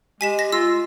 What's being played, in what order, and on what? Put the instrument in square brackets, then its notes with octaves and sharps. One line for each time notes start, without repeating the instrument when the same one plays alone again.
[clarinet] G#3 [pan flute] G4 [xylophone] G#5 B6 E7
[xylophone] A#6
[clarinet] F4 [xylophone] E6